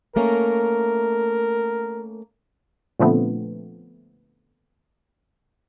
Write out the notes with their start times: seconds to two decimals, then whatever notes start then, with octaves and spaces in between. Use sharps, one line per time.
0.16 A3 A#3 C#4 A#4
3.00 A#2 D3 F3 A3 B3 C4